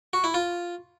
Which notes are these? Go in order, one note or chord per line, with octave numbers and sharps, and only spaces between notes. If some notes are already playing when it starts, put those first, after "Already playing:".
F#4
E4
F4